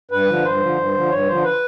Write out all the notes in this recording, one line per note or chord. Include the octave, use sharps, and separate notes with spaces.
G2 B4
D3 F3
G2 C5
D3 F3
G2
D3 F3
G2 C#5
D3 F3 C5
B4